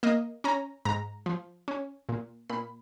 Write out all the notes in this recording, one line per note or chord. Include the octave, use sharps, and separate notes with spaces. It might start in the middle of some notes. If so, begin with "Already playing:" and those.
A#3 D#5
C#4 A#5
G#2 A#5
F3
C#4
A#2
A#2 B5